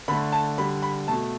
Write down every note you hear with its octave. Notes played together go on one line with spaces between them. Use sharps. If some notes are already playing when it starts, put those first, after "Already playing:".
D3 A3 B5
A5
D3 G3 B5
B5
B2 A3 A5